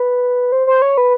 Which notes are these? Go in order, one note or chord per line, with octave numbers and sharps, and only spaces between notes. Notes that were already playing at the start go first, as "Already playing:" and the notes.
Already playing: B4
C5
C5
C#5
B4